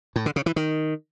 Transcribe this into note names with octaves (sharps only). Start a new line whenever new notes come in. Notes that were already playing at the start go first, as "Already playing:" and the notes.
A2
D3
C#3
E3
D#3